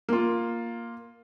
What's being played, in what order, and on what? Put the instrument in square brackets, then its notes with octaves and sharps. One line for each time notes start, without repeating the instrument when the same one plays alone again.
[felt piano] A#3 F4